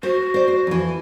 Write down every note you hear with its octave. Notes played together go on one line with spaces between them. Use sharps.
F#4 C5
C5 D5
C5
F2 E3